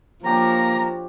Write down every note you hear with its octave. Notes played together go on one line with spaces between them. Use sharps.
F3 A#3 D4 G4 C#5 A#5